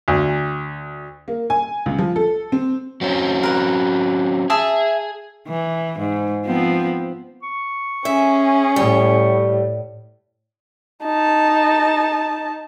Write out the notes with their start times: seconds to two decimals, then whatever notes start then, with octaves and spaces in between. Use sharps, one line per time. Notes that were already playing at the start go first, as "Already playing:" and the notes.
0.08 D2
1.28 A#3
1.50 G#5
1.86 C#2
1.99 F3
2.16 A4
2.52 C4
3.01 F#3 C4 C#4
3.43 A#4 B4
4.50 G#4 E5 A5 D#6
5.47 E3
5.99 G#2
6.46 F3 B3 C4
7.43 C#6
8.05 C#4 G#4 E5
8.76 A2 G3
11.04 D#4 A5